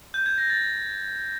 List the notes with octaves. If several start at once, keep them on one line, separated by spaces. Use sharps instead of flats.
G6
G#6
A#6
A6